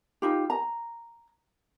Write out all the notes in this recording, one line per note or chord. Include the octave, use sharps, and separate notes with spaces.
D#4 F4 G4
A#5